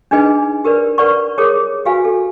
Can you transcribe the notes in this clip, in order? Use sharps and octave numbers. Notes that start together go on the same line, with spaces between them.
D4 D#4 G#4 B4 D#5 G#5
G4 A#4 B4 D5
A#4 B4 D5 F#5 C#6
G4 G#4 A#4 C#5 D6 D#6
F#4 G4 B4 F5 G#5
A4